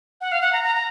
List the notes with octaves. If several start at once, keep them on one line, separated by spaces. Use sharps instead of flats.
F#5
F5
F#5
A#5
A#5
A#5